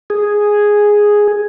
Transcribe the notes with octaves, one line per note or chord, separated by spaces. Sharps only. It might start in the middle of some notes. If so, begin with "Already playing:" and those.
G#4